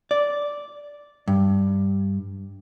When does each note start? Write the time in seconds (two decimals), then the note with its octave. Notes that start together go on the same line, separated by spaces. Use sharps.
0.11 D5
1.28 G2